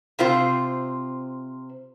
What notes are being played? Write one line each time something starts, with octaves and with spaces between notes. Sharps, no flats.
C3 C4 F4 C5